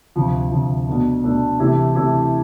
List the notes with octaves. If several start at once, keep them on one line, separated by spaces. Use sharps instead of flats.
D2 C3 F3
D2 C3 F3
B2 A3 D4
B2 A3 D4
C3 E3 A3 E4 G4
C3 E3 A3 E4 G4